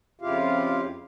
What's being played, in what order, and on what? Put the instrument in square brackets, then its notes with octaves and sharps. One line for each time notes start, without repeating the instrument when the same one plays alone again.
[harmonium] F2 C#3 E4 F4 G4 F5